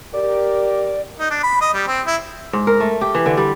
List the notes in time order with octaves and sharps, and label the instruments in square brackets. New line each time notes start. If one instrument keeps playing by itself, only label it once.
[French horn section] G4 A#4 [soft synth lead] D5
[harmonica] D#4
D4
B5
D#5
G3
C4
E4
[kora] G#2
A#4
A3
G4
E3
D3
G3